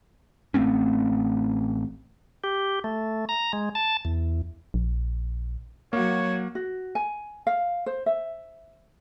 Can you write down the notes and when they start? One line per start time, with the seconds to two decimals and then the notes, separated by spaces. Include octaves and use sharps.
0.54 A1 A3 C4 C#4
2.44 G4
2.84 A3
3.29 A#5
3.53 G#3
3.75 A5
4.05 E2
4.74 A#1
5.93 F#3 A#3 F#4 C#5
6.55 F#4
6.95 G#5
7.47 F5
7.86 C5
8.06 E5